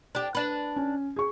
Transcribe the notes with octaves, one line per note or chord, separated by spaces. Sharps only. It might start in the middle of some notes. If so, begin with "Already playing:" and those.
D4 G4
D4 B4
C#4
G#4 C#6